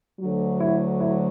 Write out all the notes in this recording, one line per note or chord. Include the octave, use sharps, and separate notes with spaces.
D2 D3 F#3
E4
E4